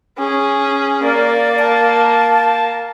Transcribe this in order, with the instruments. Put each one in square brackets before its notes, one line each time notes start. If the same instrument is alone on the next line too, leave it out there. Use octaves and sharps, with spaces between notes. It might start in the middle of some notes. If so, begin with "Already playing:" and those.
[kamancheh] C#4 G#4
[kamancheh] A#3 [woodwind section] A#4 D5
[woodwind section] F5 G5 A5